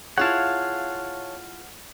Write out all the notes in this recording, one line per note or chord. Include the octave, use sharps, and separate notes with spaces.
E4 F4 G#4 C#5 F5 F#5 A5